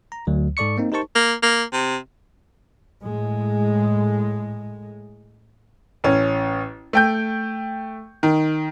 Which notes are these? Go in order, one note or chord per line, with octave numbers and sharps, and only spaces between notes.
A#5
D2 F#3
G#2 A4 D5 C#6 C#7
A#3 C4 D#4
D#4 G4 A#4 C5 A5 C#6
A#3
A#3
C3
A2 G#3
A1 C#4
A3 G5 G6
D#3